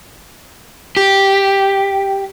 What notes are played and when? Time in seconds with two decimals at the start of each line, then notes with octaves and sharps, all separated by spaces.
0.97 G4